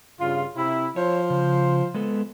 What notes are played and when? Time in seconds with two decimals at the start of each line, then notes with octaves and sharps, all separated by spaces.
0.20 G2 C#3 F4
0.56 C3 E4
0.96 F3 C5 C#5
1.30 C#3
1.94 G#3 B3 A4